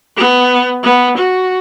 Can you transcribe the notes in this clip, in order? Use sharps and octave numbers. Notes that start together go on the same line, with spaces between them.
B3
B3
F#4